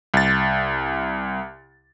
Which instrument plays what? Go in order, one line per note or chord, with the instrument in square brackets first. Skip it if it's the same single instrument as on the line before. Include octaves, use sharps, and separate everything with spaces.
[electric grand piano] C2 A6